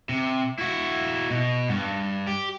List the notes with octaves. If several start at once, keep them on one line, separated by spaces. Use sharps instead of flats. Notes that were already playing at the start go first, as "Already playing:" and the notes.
C3
E4 F#4
B2
G2
G4